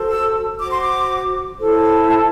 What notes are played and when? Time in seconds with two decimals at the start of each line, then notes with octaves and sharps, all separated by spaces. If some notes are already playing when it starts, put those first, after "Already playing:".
Already playing: F#4 A4 C5
0.09 E6
0.59 F#4 C5 D6
0.71 C6
0.81 D6
1.59 E4 A4 C5
2.09 A5